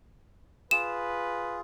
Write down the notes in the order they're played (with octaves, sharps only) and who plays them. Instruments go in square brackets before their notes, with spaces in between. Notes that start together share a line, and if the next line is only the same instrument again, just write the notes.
[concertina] F4 G#4 [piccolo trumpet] B4 [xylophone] E7